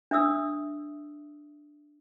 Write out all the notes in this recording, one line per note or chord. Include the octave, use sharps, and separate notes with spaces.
D4 E5 D#6 E6